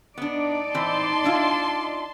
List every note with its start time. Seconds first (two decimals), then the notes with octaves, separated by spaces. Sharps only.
0.18 B3 D4 D#4 D5
0.74 E3 C4 A5 C6
1.24 D4 E4 F4